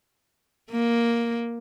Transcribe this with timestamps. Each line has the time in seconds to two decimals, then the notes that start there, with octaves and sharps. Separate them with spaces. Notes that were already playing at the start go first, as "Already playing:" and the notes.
0.71 A#3